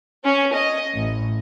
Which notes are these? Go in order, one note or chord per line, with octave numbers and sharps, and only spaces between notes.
C#4
D#5
A1